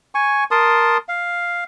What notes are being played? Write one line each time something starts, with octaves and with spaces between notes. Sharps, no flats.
G#5 C#6
A#4 A5 C6 D#6
F5